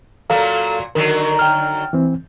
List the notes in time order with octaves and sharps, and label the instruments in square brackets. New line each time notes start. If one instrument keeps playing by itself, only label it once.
[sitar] A#2 F#3 A#3 [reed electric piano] A4 F5 A#5
[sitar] D3 D#3 F#3 [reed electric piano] A#4
[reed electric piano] G5 F6
E3 C4